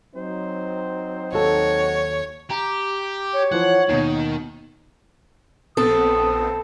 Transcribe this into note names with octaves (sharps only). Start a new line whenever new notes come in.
F#3 C4 D#4 C5
D#2 F#4 A4 C#5
G4 A#5
C#5
E3 F3 C5 F#5
D#2 B2 D#3
A#1 B3 C4 A4 D#6